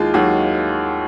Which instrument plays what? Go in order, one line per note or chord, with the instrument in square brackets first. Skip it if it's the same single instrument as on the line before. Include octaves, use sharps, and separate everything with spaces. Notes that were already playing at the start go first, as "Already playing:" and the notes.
Already playing: [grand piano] D#2 D#3 G#3 E4 F4
D#2 F#3 F#4